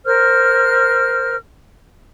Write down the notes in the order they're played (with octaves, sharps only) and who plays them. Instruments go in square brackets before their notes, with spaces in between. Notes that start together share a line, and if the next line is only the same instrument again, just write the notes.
[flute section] A#4 C5 F6